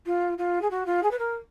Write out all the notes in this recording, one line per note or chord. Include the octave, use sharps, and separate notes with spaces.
F4
F4
G#4
F#4
F4
G#4
B4
A#4